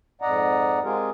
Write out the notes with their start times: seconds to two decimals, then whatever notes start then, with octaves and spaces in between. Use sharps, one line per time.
0.22 F2 G#2 D5 D#5 F#5 A#5
0.83 G#3 C4 F4 G4 G#4 A#4